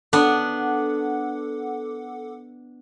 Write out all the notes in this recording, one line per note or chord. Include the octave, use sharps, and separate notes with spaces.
B3 D4 A4 F#5 D6